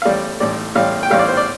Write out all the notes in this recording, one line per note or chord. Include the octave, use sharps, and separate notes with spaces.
F5
A1 A2 G3 D5
A1 A2 G3 D5
A1 A2 G3 F5
G5
A1 A2 G3 F5
D5
C5
D5